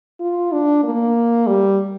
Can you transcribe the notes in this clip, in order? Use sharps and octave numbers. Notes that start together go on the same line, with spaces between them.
F4
D4
A#3
G3